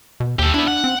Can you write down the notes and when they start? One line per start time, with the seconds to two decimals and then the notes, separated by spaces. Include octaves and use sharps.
0.20 B2
0.39 D#2 G4 A4
0.54 B3 D4 E4
0.68 F#5
0.84 C4